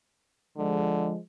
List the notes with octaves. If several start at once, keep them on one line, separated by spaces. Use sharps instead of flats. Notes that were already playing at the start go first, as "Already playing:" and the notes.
D3 F3 G#3